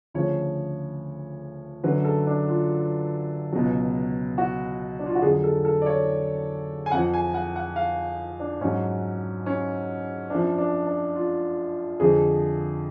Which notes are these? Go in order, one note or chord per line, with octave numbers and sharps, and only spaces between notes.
D2 C#3 F3 C#5
F#2 D3 F#3 B4
A4
D4
F4
C#2 B2 F#3
F#4
D4
F4
F#4
F2 D3 F#3 G#4
A4
A4
D5
C#5
G#5
F2 F3 F#5
G#5
F#5
F#5
F5
D4
G#2 F#3 C#4
C#4
F#2 F3 D4
D4
D4
F4
F2 D3 F3 G#4